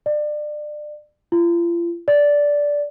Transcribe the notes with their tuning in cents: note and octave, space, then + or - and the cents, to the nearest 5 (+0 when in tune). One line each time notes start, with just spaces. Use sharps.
D5 +30
F4 -40
D5 -10